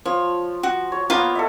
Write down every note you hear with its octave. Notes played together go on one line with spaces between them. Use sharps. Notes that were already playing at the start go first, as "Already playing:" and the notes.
F3 C#5
F#4
C#5
A#3 B3 F4 C#5
A4 D#5 E5